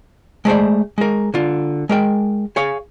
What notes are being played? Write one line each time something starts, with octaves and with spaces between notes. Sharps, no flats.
G#3 A3 C5 D5
G#3 A#4
D3 F4
G#3 A#4 G5
G#4 C#5 F5